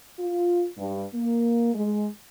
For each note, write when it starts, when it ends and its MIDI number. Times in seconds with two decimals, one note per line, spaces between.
0.19 0.66 65
0.78 1.05 43
1.14 1.72 58
1.75 2.07 56